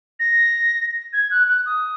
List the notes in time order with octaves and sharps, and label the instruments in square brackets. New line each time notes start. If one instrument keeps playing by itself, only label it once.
[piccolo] A#6
G#6
F#6
F#6
D#6